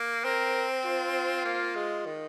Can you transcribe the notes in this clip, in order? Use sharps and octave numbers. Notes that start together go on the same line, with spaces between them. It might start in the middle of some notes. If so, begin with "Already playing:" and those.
Already playing: A#3
C4 A#4
F4
A#3
G#3
D#3